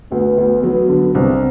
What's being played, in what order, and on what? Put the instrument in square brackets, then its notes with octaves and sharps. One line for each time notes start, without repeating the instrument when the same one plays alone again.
[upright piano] D2 [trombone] B3
[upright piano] D2
[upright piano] F#3 [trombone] B3
[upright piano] D3
[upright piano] C2 [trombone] C4